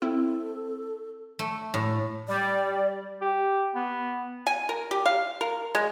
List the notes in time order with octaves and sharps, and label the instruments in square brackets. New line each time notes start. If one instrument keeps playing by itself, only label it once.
[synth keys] C4 [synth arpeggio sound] E4 [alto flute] A4
[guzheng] A3
A2
[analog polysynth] G3 [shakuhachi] D5
[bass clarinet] G4
B3
[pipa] G#5
A#4
G4
F5
A#4
G#3